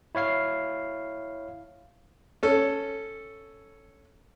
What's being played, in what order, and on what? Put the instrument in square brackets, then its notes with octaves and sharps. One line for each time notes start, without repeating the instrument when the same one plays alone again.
[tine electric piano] E4 C#5 F5 C7
[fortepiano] C#4 A4